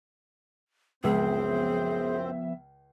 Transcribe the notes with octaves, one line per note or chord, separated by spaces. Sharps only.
C#2 F#2 F3 B3 C4 G#4 C5 E5